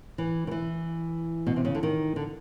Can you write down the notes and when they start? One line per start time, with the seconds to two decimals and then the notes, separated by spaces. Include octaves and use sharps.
0.18 E3
0.47 D#3
0.51 E3
1.47 B2
1.56 C3
1.65 C#3
1.75 D3
1.83 D#3
2.16 D3